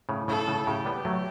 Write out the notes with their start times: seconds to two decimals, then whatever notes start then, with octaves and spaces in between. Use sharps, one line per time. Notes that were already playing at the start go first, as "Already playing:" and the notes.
0.09 A2 C#3
0.28 A2 C#3 A4
0.47 A2 C#3
0.67 A2 C#3 G4
0.85 G3 B3
1.05 F#3 A3